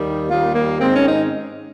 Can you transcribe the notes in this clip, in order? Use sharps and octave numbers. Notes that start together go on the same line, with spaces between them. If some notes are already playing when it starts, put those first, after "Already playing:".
Already playing: D#2 D#3 G3 A#3
D#2 D#3 G3 A#3 F4
A#3
G#2 D#3 G#3 C4
C#4
D#4